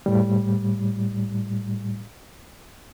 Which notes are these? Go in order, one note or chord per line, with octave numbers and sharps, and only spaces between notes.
A2 G3